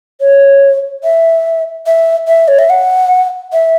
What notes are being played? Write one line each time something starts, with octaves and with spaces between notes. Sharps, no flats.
C#5
E5
E5
E5
C#5
E5
F#5
E5